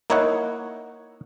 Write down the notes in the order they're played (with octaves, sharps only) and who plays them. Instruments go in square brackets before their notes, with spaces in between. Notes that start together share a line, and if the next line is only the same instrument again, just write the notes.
[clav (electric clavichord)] A#3 D#4 E4 C#5 D#5 F#5